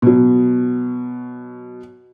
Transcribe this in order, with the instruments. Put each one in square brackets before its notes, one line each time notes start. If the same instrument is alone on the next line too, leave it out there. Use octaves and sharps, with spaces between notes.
[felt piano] B2 F#3